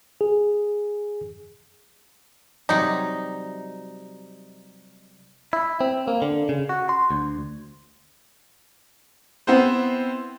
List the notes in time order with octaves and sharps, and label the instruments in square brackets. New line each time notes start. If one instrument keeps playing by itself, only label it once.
[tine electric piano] G#4
[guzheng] C3 F#3 G3 [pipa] D#4
[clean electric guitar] E4
C4
A#3
D3
C#3
F#4
C6
D2
[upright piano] B3 C4 E4 C5